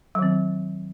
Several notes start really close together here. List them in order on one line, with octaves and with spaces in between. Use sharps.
F#3 D#3 C4